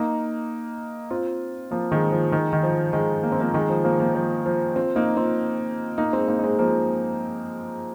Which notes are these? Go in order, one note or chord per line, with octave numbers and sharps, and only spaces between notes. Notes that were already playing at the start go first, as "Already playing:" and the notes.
Already playing: A#3 D#4
C4 F4
F3 A#3
D#3 G#3
F3
D#3 G#3
D#3
F3
D#3 G#3
A#3
C4
F3 A#3
D#3 G#3
F3
F3 A#3
F3 A#3
F3
F3
C4 F4
A#3 D#4
C4 F4
A#3 D#4
G#3 C4
A#3 D#4
D#4
G#3 C4
F3 A#3